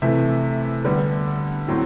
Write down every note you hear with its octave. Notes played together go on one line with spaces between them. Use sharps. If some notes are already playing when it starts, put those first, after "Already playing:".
C3 E3 A3 E5
D3 G3 B3
A2 F#3 C4